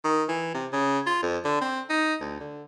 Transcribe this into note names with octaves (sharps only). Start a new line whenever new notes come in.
D#3
E3
C3
C#3
F4
F2
D3
C4
D#4
D2
D3